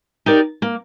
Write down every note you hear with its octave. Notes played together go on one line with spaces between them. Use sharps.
D#4 G4 A#4 D5
A#3